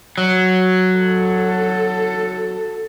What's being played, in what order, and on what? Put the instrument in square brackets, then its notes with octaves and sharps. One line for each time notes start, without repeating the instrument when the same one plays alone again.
[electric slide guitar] F#3
[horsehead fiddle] A4